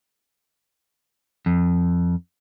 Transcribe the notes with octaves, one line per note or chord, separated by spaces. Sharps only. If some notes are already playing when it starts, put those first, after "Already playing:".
F2